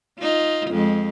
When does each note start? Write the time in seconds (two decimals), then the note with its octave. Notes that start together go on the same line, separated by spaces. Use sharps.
0.19 D#4 F4
0.69 F2 G#3